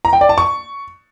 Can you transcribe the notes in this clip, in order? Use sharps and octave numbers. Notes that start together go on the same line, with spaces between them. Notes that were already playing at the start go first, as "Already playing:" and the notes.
A#5
G5
D5
A5
C#6